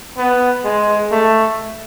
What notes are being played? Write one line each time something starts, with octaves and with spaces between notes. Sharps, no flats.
B3
G#3
A3